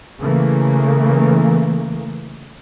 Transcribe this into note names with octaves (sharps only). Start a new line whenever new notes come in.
C#3 E3 A3 A#3